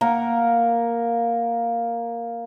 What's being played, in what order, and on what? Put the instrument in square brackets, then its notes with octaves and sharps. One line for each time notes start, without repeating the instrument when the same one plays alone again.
[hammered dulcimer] A#3 A#4 F5 F#5